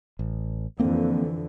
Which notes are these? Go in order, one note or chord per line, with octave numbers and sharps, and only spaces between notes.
A1
F2 D3 E3 A#3 C4